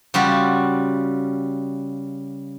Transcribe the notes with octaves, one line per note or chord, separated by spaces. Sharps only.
C#3 G3 F4 F#4